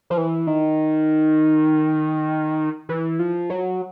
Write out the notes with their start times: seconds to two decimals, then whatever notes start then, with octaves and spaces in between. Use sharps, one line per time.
0.10 F3
0.17 E3
0.47 D#3
2.89 E3
3.19 F3
3.50 F#3